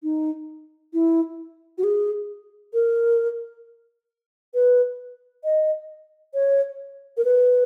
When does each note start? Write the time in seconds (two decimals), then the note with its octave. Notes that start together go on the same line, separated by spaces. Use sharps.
0.03 D#4
0.94 E4
1.78 F#4
1.84 G#4
2.74 A#4
4.54 B4
5.44 D#5
6.34 C#5
7.17 A#4
7.25 B4